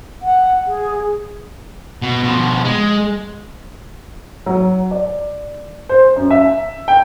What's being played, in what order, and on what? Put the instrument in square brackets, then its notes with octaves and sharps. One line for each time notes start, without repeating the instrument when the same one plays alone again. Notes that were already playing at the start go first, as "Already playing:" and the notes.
[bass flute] F#5
G#4
[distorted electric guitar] B2
B2 F3
G#3
[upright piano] F#3
D5
C5
F#2
E5
G5